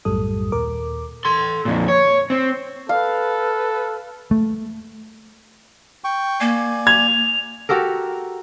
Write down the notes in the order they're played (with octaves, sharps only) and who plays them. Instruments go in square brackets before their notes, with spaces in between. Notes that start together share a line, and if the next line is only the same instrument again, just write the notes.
[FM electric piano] B1 F#2 A2 G3 A4 D#6
D#2 A#2 A#4 D6
[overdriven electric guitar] A4 C6
F2 A#2
C#5
C4
[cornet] A4 [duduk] B4 [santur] F5
[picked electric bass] A3
[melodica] G5 C#6
[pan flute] A#3 [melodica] D5 G#5
[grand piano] G#6 [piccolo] F7
[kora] F#4 G4 A4 A#4